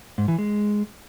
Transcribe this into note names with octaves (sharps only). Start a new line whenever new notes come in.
G#2
E3
G#3